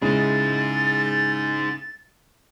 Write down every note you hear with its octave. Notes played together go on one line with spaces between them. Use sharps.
C#3 G#3 D#4 E4 G#4 A6